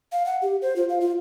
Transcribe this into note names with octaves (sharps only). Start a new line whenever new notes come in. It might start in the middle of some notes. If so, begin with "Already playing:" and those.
F5
F#5
G4
C5
F4
F5
F4